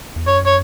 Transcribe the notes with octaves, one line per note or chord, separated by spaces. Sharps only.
E2
F#2 C#5
C#5